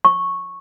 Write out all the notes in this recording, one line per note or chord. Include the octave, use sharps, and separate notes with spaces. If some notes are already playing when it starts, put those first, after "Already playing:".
C#6